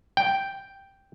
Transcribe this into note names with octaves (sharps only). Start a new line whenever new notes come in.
G5